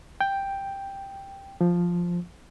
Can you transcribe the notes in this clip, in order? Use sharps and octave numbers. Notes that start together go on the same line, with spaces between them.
G5
F3